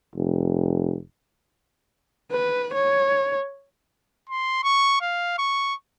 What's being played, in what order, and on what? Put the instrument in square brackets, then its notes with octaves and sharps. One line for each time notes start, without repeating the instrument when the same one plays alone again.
[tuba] F1
[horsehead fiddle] B4
C#5
[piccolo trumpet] C6
C#6
F5
C#6